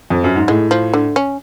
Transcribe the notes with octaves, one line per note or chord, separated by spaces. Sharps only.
F2
F#2
G#2
A2 G#3
F3
D3
C#4